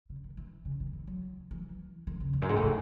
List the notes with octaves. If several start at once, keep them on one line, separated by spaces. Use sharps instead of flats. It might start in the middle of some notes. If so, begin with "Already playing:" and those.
C#3
D#3
E3
C#3
D#3
E3
F#3
E3
D#3
C#3
E2
F#2
G#2
A2
C3